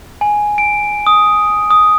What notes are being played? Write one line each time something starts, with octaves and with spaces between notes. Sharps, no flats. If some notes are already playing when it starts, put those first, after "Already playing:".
G#5
D7
D#6
D#6